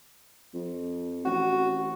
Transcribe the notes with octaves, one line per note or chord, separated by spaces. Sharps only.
F2
A1 F#4